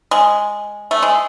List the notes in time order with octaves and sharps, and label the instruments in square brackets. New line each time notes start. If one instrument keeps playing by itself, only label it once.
[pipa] G#3
A3
G#3